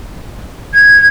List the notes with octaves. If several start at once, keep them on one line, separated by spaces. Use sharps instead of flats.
G#6